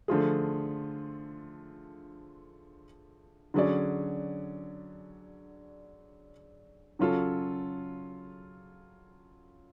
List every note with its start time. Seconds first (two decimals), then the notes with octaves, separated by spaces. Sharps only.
0.08 D3 F3 A3 F4 G#4
3.54 D3 F#3 C#4 G#4 D5
6.99 C#3 F#3 C#4 F4 A4